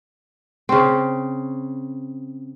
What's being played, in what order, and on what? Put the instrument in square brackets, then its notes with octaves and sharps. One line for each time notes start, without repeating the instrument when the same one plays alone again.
[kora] C#3 C4